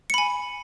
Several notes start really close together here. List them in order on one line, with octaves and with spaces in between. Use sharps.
C#7 B5 G#5